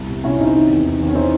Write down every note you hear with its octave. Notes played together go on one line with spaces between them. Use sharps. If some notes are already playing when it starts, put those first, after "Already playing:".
Already playing: C2
C3
C3 C#4 E4
C3 C4 D#4
D#3
E2
D#3
E2
C#4
E3 C4 D#4